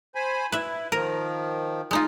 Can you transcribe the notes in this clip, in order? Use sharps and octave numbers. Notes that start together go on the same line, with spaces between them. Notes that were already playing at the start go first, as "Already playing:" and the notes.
C5 G#5 B5
E4 B4 E5
D#3 F3 A#4
G#3 D#4 F4